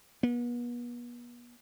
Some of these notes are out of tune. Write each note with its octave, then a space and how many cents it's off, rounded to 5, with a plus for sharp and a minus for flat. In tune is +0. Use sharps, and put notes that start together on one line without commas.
B3 -40